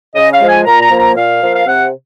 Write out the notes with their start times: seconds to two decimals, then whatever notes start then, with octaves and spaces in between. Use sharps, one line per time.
0.15 C#3 D#5
0.33 F5
0.41 F3 G#3
0.49 G#5
0.66 A#2 A#5
0.82 A#5
0.91 F3 A#3
0.99 A#5
1.16 A#2 F5
1.41 F3 A#3
1.55 F5
1.66 C3 F#5